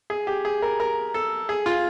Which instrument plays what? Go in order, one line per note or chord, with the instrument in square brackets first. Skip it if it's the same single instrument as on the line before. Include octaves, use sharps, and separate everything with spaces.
[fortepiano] G#4
G4
G#4
A#4
A#4
A4
G#4
F4